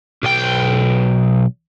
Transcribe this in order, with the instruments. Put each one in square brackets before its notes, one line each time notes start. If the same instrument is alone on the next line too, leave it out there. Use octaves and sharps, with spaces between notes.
[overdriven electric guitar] B1 G5